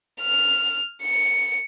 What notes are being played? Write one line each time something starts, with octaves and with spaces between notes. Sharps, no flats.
F6
C#7